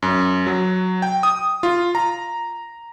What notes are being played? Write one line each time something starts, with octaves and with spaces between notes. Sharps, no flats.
F#2
F#3
G5
D#6
F4
A#5